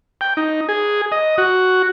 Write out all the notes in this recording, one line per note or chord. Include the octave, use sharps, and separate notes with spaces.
G5
D#4
G#4
D#5
F#4